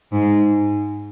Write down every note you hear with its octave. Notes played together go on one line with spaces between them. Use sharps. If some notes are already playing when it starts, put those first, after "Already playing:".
G#2